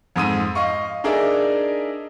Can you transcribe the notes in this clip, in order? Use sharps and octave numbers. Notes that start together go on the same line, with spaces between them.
F2 G#2 D#6 D#7
D#5 F5 C#6
D4 D#4 G#4 A#4 D5 E5